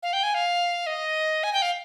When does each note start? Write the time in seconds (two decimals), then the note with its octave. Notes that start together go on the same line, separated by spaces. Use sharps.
0.03 F5
0.13 G5
0.23 G#5
0.34 F5
0.86 D#5
1.43 G#5
1.53 G5
1.62 F5